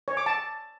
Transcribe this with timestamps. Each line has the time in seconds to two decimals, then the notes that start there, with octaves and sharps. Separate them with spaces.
0.08 C#5
0.17 D6
0.26 A5